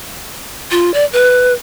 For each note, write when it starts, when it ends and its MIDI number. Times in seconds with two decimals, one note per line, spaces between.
0.71 0.93 65
0.94 1.05 74
1.13 1.53 71